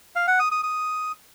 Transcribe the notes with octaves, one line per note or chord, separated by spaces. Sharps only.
F5
F#5
D#6
D#6
D#6